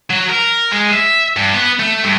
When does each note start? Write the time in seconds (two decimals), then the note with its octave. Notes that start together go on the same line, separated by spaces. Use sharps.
0.10 F#3
0.29 A#4
0.71 G#3
0.92 E5
1.37 G2
1.55 B3
1.80 A3
2.03 G2